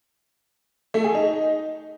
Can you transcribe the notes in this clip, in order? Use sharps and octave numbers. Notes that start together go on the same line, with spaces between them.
A3
G#4
D#4